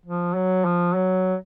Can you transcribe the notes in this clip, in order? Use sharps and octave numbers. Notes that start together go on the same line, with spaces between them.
F3
F#3
F3
F#3